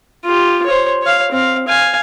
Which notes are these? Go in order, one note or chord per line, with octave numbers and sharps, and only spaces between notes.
F4 G4
C5 C#5
C#5 F5
C4 F5
F5 G#5